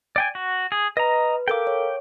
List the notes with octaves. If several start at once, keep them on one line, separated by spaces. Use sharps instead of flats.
D5 G5 G#5
F#4
G#4
B4 D#5 A#5
A4 A#4 F5 G5 D6
C#5